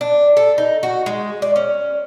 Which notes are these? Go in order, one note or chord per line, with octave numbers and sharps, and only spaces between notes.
D4
A4
D#4
F#4
G#3
D5
C#4